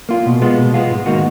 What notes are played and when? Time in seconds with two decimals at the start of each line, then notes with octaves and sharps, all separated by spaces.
0.09 A#3 F4
0.26 B2
0.42 G#3 B3 F4
0.58 B2
0.74 G#3 B3 F4
0.89 G#2
1.06 D#3 A#3 D#4 F#4